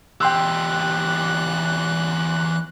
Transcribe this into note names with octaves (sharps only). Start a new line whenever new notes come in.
E2 G4 G5 C6 E6 F#6